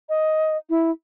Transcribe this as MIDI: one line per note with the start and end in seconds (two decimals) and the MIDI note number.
0.09 0.57 75
0.70 0.91 64